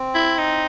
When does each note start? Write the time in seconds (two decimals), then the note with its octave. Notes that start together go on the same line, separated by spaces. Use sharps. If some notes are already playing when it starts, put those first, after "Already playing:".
Already playing: C4
0.15 E4
0.38 D#4